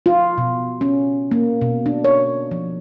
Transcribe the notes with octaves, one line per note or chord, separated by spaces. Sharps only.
F4
B2
C#4
A#3
B2
D4
C#5
F3